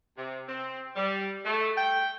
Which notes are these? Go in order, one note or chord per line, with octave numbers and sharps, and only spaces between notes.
C3
C4
G3
A3
G5